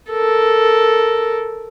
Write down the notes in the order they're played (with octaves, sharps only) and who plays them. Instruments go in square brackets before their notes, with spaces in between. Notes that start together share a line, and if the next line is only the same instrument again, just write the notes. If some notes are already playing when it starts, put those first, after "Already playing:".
[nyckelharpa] A4 A#4